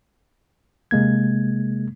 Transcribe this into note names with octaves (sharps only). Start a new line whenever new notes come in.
C3 G#3 A#3 G#6